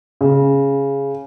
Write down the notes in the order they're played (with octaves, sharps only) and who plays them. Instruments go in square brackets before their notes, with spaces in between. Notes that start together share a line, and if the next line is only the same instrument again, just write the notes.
[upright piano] C#3